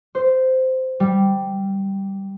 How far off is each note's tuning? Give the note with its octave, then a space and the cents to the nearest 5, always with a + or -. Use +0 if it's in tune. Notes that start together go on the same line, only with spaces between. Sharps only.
C5 -10
G3 -5